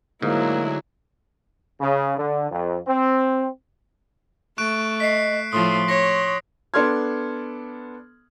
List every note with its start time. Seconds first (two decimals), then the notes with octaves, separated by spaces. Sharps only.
0.22 D2 G#2 F#3 A#3 E4
1.80 C#3
2.17 D3
2.50 F2
2.86 C4
4.58 A3 C#6 F#6 D7
5.00 D#5 B6 C7
5.53 A2 F3 C6 D#6
5.88 C#5 A#6
6.74 B3 D4 A4 C6 F6 G#6